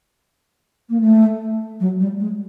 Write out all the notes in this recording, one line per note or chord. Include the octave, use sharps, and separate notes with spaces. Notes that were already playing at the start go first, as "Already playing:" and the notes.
A#3
A3
F#3
G3
G#3